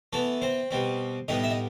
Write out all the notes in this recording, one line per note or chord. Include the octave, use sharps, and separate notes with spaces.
E3 A3 B3 A4
C4 C5
B2 G3 C4
A2 G3 B3 D#4 D#5
E5
D#5